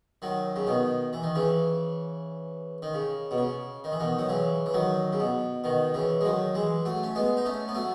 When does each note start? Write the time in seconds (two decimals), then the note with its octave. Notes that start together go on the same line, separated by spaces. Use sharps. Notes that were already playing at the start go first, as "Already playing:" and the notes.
0.22 D#3 F#3
0.56 C#3
0.67 B2 D#3
1.13 E3
1.23 D#3
1.35 C#3 E3
2.82 D#3
2.94 C#3
3.31 B2
3.38 C#3
3.84 D#3
3.92 E3
4.00 B2 D#3
4.19 F#3
4.29 C#3 E3
4.66 E3
4.74 D#3 F#3
5.13 C#3
5.20 B2
5.64 B2 D#3
5.94 C#3 E3
6.21 G#3
6.24 D#3 F#3
6.55 E3 G#3
6.85 F#3 A3
7.03 C#4
7.15 G#3 B3
7.37 D#4
7.45 A3 C#4
7.68 B3
7.75 F#3 A3